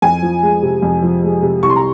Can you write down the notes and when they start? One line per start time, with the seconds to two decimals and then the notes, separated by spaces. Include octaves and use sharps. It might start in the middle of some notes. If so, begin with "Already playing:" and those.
0.02 F2 G#5
0.22 F3
0.43 G#3
0.62 C3
0.82 F2
1.02 F3
1.23 G#3
1.42 C3
1.63 C2 C#6
1.70 C6
1.76 A#5